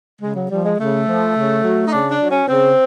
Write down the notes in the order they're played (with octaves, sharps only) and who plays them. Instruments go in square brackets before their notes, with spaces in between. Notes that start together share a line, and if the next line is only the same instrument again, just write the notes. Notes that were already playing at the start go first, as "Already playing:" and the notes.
[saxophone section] C#3 G#3
F#3
F3 G3
G#3
C#3 A3
F3
C#3
F#3
D#4
C#3 D4
D4
F#3
C#4
C#3 C4